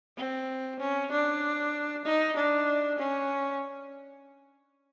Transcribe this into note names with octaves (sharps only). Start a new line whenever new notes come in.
C4
C#4
D4
D#4
D4
C#4